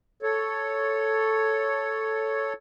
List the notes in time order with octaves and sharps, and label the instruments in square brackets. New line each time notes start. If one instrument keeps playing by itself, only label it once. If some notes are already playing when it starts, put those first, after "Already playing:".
[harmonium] A4 C#5